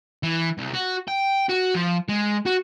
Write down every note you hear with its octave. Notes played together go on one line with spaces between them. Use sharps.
E3
C2
F#4
G5
F#4
F3
G#3
F#4